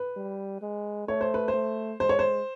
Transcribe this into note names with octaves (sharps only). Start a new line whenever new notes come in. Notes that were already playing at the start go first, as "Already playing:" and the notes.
Already playing: B4
G3
G#3
A3 C#5
C5
B4
C5
A3
G#3 C5
C#5
C5